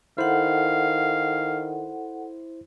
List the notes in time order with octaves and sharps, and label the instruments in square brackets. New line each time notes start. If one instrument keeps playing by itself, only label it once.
[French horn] D#3 [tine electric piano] E4 C5 [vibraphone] A4 F#5 [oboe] F5